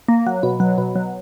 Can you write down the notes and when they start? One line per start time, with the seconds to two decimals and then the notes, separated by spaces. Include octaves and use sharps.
0.08 A#3
0.27 F#3
0.43 B2
0.60 F#3
0.78 B2
0.96 F#3